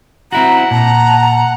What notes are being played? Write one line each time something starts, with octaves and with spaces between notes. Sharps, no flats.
C4 E4 F#4 F#5 A#5
A#2 A5 A#5